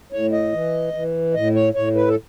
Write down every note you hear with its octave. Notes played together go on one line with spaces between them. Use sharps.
A2 C#5
D#5
E3
E3
A2 D#5
C#5
A2 C#5
B4
A4